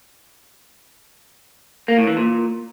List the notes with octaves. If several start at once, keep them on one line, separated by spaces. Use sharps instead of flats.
A#3
A2
E3
A#2